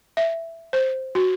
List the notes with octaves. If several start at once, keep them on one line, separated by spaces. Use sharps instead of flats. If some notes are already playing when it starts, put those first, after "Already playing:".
E5
C5
F#4